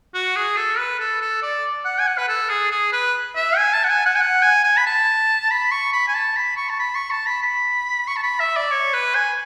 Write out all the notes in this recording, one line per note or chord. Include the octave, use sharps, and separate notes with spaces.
F#4
G#4
A4
B4
A4
A4
D5
F#5
G#5
F#5
B4
A4
G#4
G#4
B4
E5
G#5
A5
F#5
G#5
F#5
G#5
F#5
G#5
G#5
B5
A5
B5
C#6
B5
G#5
A5
B5
C#6
A5
B5
C#6
A5
B5
B5
C#6
A5
B5
E5
D5
C#5
B4
G#5